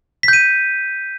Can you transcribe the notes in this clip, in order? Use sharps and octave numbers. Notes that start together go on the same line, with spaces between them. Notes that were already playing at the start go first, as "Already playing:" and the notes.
G6 B6 D#7